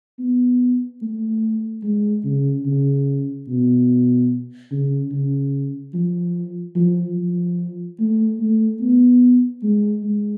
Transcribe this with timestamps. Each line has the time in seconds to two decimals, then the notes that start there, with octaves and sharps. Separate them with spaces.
0.19 B3
1.02 A3
1.83 G#3
2.25 C#3
2.66 C#3
3.48 B2
4.71 C#3
5.12 C#3
5.94 F3
6.76 F3
7.17 F3
8.00 A3
8.40 A3
8.81 B3
9.63 G#3
10.04 G#3